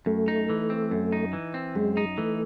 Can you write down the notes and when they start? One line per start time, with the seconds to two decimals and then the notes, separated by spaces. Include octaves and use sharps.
0.06 F#2 A3
0.28 D#4
0.50 E3
0.70 C4
0.91 F#2
1.12 D#4
1.33 E3
1.54 C4
1.75 F#2 G#3
1.97 D#4
2.18 E3 A3